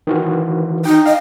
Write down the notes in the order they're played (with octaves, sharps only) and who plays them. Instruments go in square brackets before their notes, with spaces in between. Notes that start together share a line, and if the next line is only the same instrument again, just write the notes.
[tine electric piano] D#3 E3 F#4
[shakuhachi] D#4 [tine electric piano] G5
[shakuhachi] D#5 [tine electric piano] F5